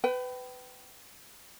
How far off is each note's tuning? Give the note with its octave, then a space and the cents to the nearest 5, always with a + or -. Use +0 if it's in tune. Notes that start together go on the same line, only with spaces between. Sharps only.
B4 +25 G5 -25